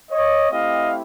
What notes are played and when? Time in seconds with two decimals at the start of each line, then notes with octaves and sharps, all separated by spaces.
0.11 C#5 D#5
0.51 A3 C4 E4 G4 D#5 F5